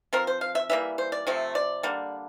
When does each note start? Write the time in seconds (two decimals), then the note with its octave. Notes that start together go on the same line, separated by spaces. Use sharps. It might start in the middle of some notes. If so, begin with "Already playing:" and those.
0.13 F3 C4 A#4
0.27 C5
0.41 F5
0.55 E5
0.70 E3 G3 A#3 E5
0.98 C5
1.12 D5
1.27 C3 F3 A3 C4
1.55 D5
1.83 D3 G3 A#3